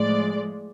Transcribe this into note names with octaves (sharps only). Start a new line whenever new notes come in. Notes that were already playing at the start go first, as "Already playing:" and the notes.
Already playing: A2 F3 G#3 D5